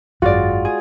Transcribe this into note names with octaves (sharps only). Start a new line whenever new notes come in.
G#1 F#2 G#3 F4 F#4 D5
G#4